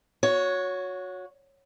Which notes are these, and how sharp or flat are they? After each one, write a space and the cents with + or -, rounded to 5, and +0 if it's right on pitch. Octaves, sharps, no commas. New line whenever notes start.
F#4 -20 C#5 +5